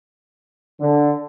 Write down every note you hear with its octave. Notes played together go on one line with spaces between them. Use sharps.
D3